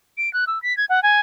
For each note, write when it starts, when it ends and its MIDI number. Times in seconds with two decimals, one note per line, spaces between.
0.17 0.32 98
0.33 0.45 90
0.47 0.61 88
0.62 0.75 95
0.77 0.85 92
0.89 1.02 78
1.03 1.20 80